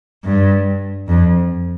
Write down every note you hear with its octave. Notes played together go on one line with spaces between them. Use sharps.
G2
F2